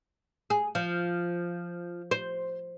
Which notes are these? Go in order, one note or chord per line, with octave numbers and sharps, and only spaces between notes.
G#4
F3
C5